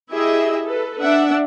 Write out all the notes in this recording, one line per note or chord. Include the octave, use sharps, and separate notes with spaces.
E4 G4 G#4 D#5 E5
A4 B4
D4 E5 F#5